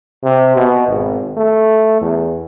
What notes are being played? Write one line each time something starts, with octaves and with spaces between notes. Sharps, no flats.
C3
B2
G#1
A3
E2